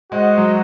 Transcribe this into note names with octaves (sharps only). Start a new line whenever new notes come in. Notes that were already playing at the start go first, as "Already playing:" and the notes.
G#3 F#4 C5 D#5 F#5
F#3